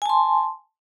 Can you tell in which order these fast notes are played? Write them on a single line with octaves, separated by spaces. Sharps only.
G#5 A5 C6